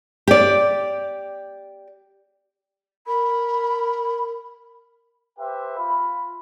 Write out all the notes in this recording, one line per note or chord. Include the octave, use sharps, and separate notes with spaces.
G4 D5
A#4 B5
G4 B4 C5 E5 G5
F4 B5